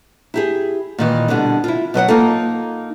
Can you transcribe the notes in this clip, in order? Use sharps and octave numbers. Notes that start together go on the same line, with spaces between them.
E4 G4 G#4
A#2 D#3 E3
B2 D3 G3 D4
E4 F4
B2 F#3 D#5 F#5
A#3 D#4 F4 A4